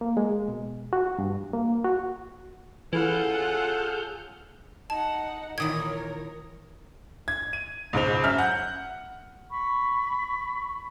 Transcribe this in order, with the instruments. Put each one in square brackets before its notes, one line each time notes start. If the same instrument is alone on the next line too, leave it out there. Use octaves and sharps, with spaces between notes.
[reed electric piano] A#3
G#3
B2
F#4
G2
A#3
F#4
[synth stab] E3 [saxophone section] C#4 A4 [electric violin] F4 F#5 [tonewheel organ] G#4 F6 G6
[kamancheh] D#4 F#5 [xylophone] A5
[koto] A#2 D#3 E3 [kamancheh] A#4 C#5 [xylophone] D#6 G#6
[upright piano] G#6
D#7
C#2 G#2 C5 F7
F#2 E5 F6
F#5 G6
[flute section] B5 C#6